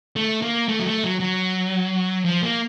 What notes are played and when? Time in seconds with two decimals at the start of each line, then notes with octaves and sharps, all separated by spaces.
0.16 A3
0.42 A#3
0.68 A3
0.79 F#3
0.85 A3
1.04 F#3
1.20 F#3
2.25 F3
2.42 A#3